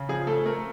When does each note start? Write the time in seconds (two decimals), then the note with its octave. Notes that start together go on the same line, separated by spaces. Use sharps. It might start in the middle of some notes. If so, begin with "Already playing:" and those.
Already playing: C#3
0.09 F3 G#4
0.27 A3 A4
0.46 A3 A#4